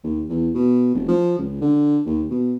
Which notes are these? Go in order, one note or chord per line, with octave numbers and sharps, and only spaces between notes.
D#2
E2
B2
F1
F3
C#2
D3
D#2
B2